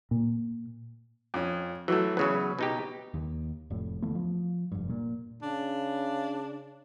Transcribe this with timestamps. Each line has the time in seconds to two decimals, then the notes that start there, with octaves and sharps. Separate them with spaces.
0.11 A#2
1.34 F2 C#4
1.88 E3 F#3 A3 F#4
2.17 E2 C#3 F#3 B4 C#5 C#6
2.59 B2 D#4 G4
3.14 D#2
3.70 F1 A2
4.02 D2 E3 A3 B3
4.15 F3
4.72 F1 G2
4.90 A#2
5.42 C#3 D4